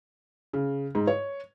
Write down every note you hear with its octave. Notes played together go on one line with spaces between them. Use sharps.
C#3
G#2
C#5